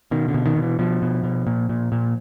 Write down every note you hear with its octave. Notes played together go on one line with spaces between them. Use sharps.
B2 D#3
D3
B2
D#3
B2
E3
B2 F3
B2
B2
A#2
A#2
A#2